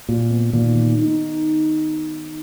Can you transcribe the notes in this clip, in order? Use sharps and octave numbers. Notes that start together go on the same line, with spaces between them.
A#2 F#4
B3
A#2 D#3
D#3
D#4